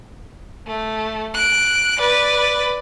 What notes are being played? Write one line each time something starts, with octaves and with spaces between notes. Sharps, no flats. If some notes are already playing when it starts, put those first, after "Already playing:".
A3
F#6 D7
B4 D5